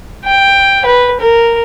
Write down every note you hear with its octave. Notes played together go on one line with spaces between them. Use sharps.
G5
B4
A#4